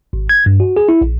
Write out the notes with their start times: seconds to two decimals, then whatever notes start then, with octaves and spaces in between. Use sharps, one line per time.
0.13 G#1
0.29 G#6
0.46 G2
0.60 F#4
0.77 G#4
0.89 E4
1.01 A#1